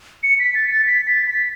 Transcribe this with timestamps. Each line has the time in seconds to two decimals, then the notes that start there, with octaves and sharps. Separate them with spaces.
0.23 C#7
0.39 B6
0.55 A6
0.71 A6
0.87 B6
1.08 A6
1.28 B6